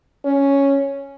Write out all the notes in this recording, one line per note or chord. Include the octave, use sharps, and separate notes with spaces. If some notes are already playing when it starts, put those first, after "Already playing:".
C#4